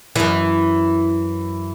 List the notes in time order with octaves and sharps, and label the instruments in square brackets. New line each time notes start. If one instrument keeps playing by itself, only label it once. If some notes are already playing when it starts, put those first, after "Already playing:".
[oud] F#2 E3